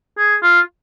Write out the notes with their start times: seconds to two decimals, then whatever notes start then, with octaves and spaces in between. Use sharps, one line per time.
0.18 G#4
0.43 F4